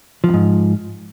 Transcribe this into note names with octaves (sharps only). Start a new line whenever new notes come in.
F2 G#2 F3